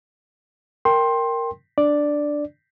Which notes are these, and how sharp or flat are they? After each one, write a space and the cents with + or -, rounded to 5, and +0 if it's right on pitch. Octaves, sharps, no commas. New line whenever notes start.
A#4 -5 G5 +0 C6 +15
D4 +0 D5 +0